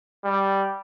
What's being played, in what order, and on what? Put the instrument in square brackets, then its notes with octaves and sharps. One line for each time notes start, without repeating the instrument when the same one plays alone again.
[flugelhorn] G3